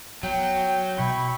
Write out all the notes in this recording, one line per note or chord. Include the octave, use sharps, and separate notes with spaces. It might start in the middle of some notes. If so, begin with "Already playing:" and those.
F#3 B3 G5
B2 E4 B5 C#6